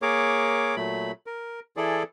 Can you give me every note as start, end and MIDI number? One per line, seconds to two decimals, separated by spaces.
0.02 0.75 58
0.02 0.75 68
0.02 0.75 70
0.02 0.75 73
0.02 0.75 86
0.76 1.12 46
0.76 1.12 54
0.76 1.12 57
0.76 1.12 83
1.27 1.60 70
1.77 2.03 52
1.77 2.03 64
1.77 2.03 68
1.77 2.03 69
1.77 2.03 74